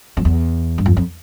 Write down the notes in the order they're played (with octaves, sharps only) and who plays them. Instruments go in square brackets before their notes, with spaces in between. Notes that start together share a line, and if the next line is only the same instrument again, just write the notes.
[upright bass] F2
E2
G2
F2
F2